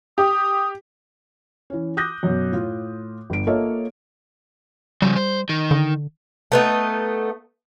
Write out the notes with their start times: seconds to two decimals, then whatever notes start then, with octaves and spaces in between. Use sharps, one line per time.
0.18 G4 D#6
1.70 E3 C#4
1.97 D6 D#6 F#6 G6 A#6
2.23 F#2 B2
2.52 A2 F4
3.30 G1 D7
3.47 A#3 F4 A4 C#5 D#5 E5
5.02 C#3 F3 G3
5.16 C5
5.49 D#3
5.71 D3
6.52 A3 B3 D#4